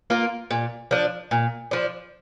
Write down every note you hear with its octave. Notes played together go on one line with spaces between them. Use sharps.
A#3 F4 A#4
A#2
F3 D4
A#2
F3 D4